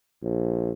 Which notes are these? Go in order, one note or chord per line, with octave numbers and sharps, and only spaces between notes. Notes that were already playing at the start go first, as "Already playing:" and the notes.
A#1